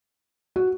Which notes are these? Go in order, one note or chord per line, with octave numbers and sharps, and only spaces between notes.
F#4